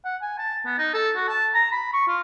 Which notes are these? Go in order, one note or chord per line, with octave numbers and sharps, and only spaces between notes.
F#5
G#5
A5
B3
D#4
A4
F#4
A5
A#5
B5
C#6
F4